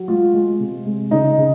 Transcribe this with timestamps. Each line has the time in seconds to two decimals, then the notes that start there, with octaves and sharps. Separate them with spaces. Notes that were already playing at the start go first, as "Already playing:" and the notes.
Already playing: F#3
0.08 G#3 F4
0.34 G#3
0.60 C3
0.85 G#3
1.11 C#3 D#4
1.38 C#3